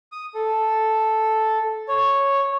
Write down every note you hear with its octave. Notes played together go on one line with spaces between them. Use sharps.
D#6
A4
C#5